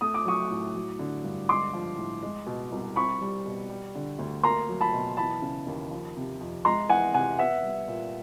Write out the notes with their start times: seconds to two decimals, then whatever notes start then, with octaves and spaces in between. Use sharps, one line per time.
0.01 A3 D#6
0.14 D6
0.25 F#3 C#6 D#6
0.51 A2
0.75 F#3
0.99 D3
1.24 G2
1.49 G#3 C6 D6
1.73 F3
1.98 A2
2.23 G#3
2.47 B2
2.72 C2
2.96 C4 B5 C#6
3.21 G3
3.46 B2
3.70 G3
3.95 D3
4.19 D2
4.43 A#3 A#5 C6
4.69 F#3
4.81 A5 B5
4.93 B2
5.17 E3 A5 B5
5.42 C#3
5.67 D#2
5.91 F3
6.16 C3
6.41 F2
6.65 G#3 A#5 C6
6.89 E3 F#5 G#5
7.14 C3 F#5 G#5
7.38 B3 E5 F#5
7.63 G3
7.88 A#2